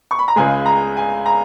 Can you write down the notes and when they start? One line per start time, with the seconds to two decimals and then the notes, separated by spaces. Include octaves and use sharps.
0.11 C#6
0.19 B5
0.28 A#5
0.36 C#2 C#3 G#3 G#5
0.66 A#5
0.97 G#5
1.26 A#5